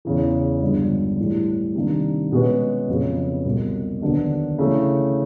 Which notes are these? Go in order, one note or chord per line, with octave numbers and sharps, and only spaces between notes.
E2 C#3 E3
G1 G2 D3 F3 G#3
A2 E3 G3
C3 D#3 G3 A#3 D4
B2 G#3 C#4 F#4 B4
F2 C#3 F#3 B3
C2 B2 F#3
D#2 D3 F#3 B3 D4
C#3 E3 A3